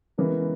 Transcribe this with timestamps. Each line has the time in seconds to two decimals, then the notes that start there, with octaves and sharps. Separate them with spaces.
0.18 C#3 E3 G#3 B3 A#4